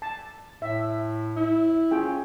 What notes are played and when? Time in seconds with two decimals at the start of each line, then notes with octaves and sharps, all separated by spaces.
0.02 A5
0.62 A2 E5
1.36 E4
1.91 C#4 F4 G#4 G5